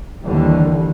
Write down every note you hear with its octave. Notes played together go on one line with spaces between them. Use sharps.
D#2 D3 E3 G3